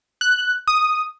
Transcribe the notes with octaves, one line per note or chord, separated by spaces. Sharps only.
F#6
D#6